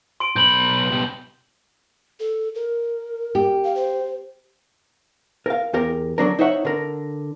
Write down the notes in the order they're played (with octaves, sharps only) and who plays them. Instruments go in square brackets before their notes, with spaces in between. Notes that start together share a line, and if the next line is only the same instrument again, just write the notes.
[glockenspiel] C6 D7
[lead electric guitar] B1 B5 [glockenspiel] G6 F#7 G7
[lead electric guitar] B2 G3
[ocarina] A4
A#4
[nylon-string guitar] G4
[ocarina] F5
C5
[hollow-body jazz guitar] A#4 F5
E2 G4 A#4
D3 F#3 D4 A#4
D#4 C5 C#5 E5 F#5
D3 A#4